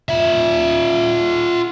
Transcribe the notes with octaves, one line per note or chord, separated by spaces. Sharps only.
F4 E5